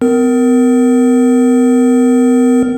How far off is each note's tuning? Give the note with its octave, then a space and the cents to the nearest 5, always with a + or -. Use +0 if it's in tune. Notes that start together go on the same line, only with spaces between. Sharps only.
B3 +45 A#4 +0